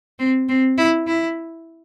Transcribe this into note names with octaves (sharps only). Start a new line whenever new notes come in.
C4
C4
E4
E4